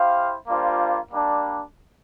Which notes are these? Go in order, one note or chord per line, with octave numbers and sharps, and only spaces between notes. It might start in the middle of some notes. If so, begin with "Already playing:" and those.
Already playing: E4 G4 C5 F5
G3 A#3 D4 F4 C5
G3 A#3 D4